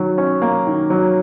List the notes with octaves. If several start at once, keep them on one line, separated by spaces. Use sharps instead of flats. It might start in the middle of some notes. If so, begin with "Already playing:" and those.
Already playing: D#3 F#3
C#4
A#3
D#3
F#3